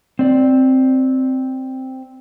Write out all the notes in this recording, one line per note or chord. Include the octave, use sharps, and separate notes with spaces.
C4 D5